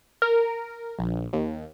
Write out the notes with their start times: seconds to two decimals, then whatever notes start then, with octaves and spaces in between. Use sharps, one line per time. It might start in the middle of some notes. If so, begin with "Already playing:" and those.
0.22 A#4
0.99 A#1
1.33 D#2